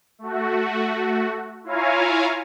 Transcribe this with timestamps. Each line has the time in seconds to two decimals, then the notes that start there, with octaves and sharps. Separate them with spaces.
0.19 A3 F#4
1.64 E4 F4 C#5 F5 G#5 A#5